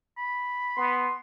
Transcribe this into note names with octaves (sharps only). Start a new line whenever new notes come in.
B5
B3 C6